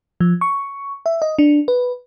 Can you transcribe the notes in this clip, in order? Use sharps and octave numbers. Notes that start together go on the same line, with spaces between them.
F3
C#6
E5
D#5
D4
B4